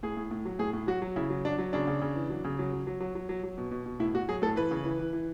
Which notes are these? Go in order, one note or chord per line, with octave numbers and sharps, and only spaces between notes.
A2 G#4
A2
A2
F#3
A2 G#4
A2
F#3 F#4
F#3
C#3 E4
F#3
F#3 D4
F#3
C#3 D4
C#3
C#3
E3
F#3
C#3
F#3
F#3
F#3
F#3
F#3
F#3
F#3
B2
B2
B2
A2 E4
A2 F#4
F#3 G#4
A2 A4
E3 B4
C#3
E3
E3
E3